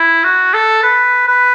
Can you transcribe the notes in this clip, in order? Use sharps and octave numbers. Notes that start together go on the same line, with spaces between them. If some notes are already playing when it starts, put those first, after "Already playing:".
Already playing: E4
F#4
A4
B4
B4